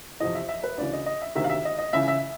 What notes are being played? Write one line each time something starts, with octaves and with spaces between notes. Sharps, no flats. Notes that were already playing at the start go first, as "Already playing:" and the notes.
F2 C3 E3 D#5
E5
E5
B4
D2 C#3 E3 D5
D#5
D#5
E5
D2 C3 D#3 E5
F5
E5
D#5
D#5
C#2 C#3 E3 E5
E5